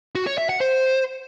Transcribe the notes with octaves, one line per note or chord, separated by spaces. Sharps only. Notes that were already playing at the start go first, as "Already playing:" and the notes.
F#4
C#5
E5
F#5
C5